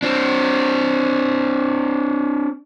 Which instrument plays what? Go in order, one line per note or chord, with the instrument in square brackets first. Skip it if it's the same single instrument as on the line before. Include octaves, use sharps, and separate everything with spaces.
[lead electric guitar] C4 D4